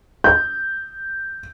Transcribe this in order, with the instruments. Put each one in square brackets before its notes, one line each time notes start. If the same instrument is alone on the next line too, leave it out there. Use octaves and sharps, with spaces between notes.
[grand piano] G6